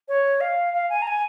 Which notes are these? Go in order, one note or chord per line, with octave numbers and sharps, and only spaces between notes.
C#5
F5
F5
G#5
A#5
G#5